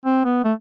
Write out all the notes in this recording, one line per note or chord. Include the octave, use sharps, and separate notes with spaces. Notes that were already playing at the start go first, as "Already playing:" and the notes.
C4
B3
A3